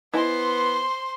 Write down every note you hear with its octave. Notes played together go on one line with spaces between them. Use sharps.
B3 E4 C5 D#5 G#5 C6